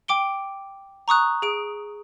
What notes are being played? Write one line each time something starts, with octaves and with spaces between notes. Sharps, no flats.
G5 D6 D7 G7
A#5 C#6 D#6 F#6
G#4 D7